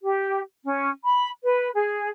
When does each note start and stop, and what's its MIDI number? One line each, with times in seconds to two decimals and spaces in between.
0.03 0.41 67
0.64 0.88 61
1.04 1.30 83
1.42 1.68 71
1.74 2.08 68